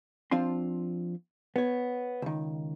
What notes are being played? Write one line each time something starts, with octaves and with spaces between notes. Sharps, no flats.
F3 C4 D4 F4 C6
B3 C#5
C#2 D#3